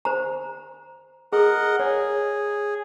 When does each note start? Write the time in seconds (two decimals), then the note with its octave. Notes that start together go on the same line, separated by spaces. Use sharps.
0.05 C5 A#5
1.33 G#4 A#4 D#5 F#5
1.80 G#4 C#5